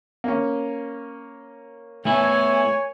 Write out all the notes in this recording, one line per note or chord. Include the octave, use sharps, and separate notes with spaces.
A#3 C#4
A3 B3 E4 C#5 G#5